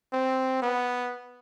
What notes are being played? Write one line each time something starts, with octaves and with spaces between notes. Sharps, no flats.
C4
B3